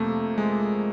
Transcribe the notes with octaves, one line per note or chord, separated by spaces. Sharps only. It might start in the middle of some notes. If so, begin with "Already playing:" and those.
Already playing: F2 C3 F3 A3 A#3
G#3